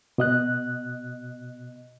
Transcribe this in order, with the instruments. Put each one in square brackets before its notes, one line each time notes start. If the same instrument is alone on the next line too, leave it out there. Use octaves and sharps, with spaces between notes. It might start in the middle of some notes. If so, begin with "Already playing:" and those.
[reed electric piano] B2 D#5 F#6